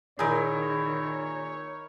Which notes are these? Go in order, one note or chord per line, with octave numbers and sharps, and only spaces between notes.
A#2 D#3 D#4 E4 G#4 A#4 C#5